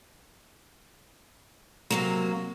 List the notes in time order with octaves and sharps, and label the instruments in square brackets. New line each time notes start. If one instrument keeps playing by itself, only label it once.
[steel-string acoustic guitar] C3 F#3 A#3